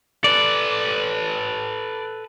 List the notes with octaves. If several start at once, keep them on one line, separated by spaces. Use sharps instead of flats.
A4 B4 D5